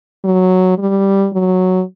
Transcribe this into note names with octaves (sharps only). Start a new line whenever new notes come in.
F#3
G3
F#3